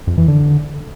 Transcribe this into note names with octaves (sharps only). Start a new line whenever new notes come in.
F2
E3
D3